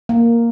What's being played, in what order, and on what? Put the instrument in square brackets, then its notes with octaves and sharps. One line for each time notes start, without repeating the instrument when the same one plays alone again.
[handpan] A#3